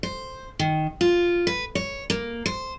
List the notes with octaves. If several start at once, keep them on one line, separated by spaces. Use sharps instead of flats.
C5
D#3
F4
B4
C#5
A#3
C5